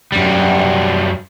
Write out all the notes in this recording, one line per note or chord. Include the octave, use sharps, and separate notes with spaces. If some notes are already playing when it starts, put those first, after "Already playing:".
F#2 G3